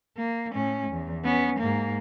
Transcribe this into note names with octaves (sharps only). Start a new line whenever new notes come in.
A#3
A2 C#4
E2
B3 C#4
G#2 A#3